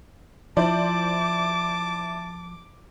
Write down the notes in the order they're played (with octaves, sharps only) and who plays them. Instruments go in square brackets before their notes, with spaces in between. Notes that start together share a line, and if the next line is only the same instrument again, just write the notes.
[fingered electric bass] F3 [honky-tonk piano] E4 C5 D5 [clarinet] A5 [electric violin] D6